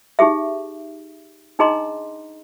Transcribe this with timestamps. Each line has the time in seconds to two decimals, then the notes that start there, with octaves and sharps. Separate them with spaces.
0.19 D#4 G4 G#4 E5
1.59 D4 D#4 G#4 D#5 A#5 C6